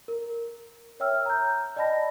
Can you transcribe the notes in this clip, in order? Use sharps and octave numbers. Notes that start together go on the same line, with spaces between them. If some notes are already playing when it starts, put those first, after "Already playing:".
A#4
C#5 E5 G5 E6 F6
A#5 G6
D5 D#5 G5 A5 B5 A#6